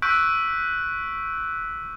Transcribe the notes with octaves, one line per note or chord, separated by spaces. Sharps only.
C#6 E6 F#6 G6 B6 D7